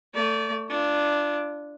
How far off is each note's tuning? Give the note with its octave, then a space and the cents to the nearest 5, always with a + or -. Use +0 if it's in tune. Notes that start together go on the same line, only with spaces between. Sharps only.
A3 +20 D5 -30
D4 +0 F4 -35